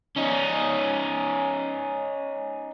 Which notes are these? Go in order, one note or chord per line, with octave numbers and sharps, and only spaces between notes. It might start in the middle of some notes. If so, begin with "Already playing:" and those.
C#4 D#4